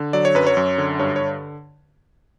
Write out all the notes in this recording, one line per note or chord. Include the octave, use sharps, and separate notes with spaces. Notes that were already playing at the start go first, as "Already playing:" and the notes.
Already playing: D3
F#3 D5
C#5
F#2 B4
C#5
F#2
D3
G2 C#5
C#5
D3